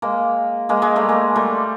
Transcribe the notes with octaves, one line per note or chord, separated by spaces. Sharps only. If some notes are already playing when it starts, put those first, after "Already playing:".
G#3 A#3
G#3 A#3
G#3 A#3
G3 A3
G#3 A#3
G3 A3